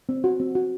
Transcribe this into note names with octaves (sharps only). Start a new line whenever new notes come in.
C4
F#4
C4
F#4